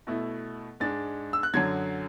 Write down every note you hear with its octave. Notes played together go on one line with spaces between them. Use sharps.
B2 A3 E4
G#2 G#3 D4 A6
E6
F#6
F#2 D3 F#3 G#6